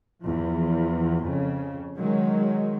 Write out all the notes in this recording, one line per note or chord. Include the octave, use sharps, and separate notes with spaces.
E2 F3
F2 C#3
D#3 F#3 G#3